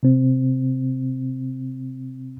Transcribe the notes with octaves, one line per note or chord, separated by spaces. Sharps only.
C3 C4